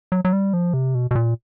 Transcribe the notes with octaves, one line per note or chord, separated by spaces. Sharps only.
F#3
F#3
G3
F3
C3
B2
B2
A#2